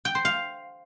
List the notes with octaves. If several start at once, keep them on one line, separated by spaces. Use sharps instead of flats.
G5
C5
F5